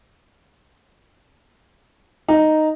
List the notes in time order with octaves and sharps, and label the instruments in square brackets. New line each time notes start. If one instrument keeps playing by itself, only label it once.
[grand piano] D#4